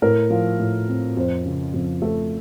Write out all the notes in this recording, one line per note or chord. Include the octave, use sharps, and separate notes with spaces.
A2 A#4
F3
A2
C4
F2 C5
C#3
F2
A3